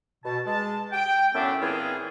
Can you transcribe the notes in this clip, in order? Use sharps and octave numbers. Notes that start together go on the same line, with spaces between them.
B2 A5
G#3 A5
G5
F#2 A2 B3 C#4 D4 E5
A#2 E3 C4 E4 F4 G#4